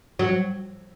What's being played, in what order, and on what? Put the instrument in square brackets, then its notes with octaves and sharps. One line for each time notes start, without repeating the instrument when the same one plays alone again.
[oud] F#3